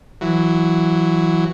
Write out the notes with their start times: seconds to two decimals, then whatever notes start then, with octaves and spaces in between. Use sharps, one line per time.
0.21 E3 F#3